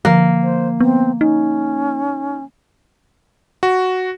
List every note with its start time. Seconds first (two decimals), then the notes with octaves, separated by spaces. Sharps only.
0.05 D3 F3 A#3
0.43 C5
0.80 B3 C4
1.21 C#4 D#4
3.63 F#4